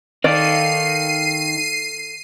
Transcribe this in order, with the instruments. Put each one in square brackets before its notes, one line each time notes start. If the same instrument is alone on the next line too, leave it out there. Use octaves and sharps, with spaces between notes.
[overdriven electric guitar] D#3 [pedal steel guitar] A4 F5 [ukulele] D5 [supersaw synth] C7 D#7